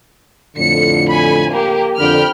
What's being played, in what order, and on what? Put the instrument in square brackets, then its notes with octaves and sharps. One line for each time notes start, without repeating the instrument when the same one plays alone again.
[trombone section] F2 A2 D3 [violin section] C#7
[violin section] G#5 B5
A#3 G4
[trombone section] F2 D3 [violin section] G5 B5 F6